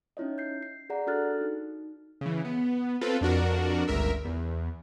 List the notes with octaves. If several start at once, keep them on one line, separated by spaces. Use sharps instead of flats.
C#4 D#4 E4 C#5 D#5
G6 C7
C7
G#4 D5 F#5 A#5
D4 F#4 A4 F6 F#6 A6
D#4
C#3 E3
B3
C4 F4 A4 B4
F2 D4 F#4 A#4
G1 C#2 A#4 E5
E2